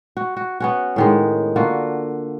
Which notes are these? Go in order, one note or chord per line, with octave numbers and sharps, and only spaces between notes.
F#4
F#4
B3 C#4 F#4
A2 D#3 G#3
D3 A#3 F4 F#4